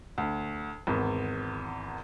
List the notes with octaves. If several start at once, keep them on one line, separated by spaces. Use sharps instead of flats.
D2
G#1 E2